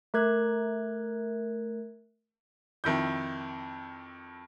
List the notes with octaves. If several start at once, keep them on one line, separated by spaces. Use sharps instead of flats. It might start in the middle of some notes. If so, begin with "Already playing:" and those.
A3 A#4 F#6 G#6
F2 D#3 E4 G6